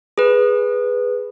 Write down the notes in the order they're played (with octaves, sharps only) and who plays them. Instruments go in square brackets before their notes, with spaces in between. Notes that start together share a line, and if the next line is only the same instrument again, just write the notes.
[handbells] G#4 B4